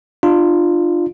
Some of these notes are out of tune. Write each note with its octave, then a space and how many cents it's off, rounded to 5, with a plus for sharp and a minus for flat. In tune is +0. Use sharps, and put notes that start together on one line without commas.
D4 +40 F4 +0